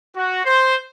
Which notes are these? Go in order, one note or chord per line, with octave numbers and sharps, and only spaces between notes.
F#4
C5